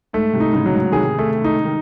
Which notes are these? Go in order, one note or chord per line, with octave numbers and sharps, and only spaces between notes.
G#2 A3
G#2 C3
D#4
A2 C#3
F#3
G#2
C3 D#3 G#4
A3
D#4
D#3